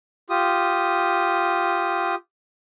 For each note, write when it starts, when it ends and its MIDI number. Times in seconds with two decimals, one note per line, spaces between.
0.30 2.15 65
0.30 2.15 67
0.30 2.15 87